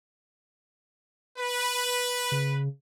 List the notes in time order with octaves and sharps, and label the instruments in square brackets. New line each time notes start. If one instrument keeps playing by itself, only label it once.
[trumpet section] B4
[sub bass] C#3